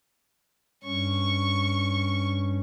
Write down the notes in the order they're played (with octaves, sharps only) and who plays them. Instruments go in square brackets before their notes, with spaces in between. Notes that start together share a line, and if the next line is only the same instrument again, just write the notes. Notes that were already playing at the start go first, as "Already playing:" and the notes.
[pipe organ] G2 C#4 [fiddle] C#6